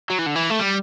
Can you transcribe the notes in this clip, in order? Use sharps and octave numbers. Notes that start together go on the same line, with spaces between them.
F#3
E3
D3
E3
A3
G3